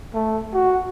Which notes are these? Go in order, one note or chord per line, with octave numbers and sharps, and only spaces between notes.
A3
F#4